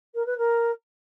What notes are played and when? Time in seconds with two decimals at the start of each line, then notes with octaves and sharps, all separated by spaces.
0.14 A#4
0.26 B4
0.37 A#4